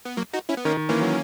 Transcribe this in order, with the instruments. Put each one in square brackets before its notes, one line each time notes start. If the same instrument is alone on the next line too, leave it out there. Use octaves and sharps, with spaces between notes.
[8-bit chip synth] B3
F#3 A#3
D#4 F#4
C#4 E4
B3
[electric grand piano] D#3 [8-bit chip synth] A#3 C#4
[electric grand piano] D#3
[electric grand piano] E3 [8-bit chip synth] A#3 C#4
[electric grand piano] F#3